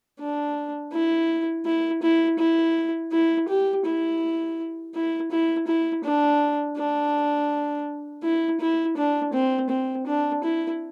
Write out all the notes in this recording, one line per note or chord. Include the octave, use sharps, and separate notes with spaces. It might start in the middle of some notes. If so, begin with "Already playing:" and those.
D4
E4
E4
E4
E4
E4
G4
E4
E4
E4
E4
D4
D4
E4
E4
D4
C4
C4
D4
E4